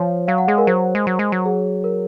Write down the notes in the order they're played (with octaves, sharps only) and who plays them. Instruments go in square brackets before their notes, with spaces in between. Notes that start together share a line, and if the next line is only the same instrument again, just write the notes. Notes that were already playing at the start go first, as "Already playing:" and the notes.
Already playing: [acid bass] F3 [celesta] C#5
[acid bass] F#3 [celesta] F5
[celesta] F#5
[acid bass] G#3 [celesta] G#4
[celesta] A#4
[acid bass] F#3 [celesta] C5
[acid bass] G#3
F#3
G#3
F#3
[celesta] G#4
A#4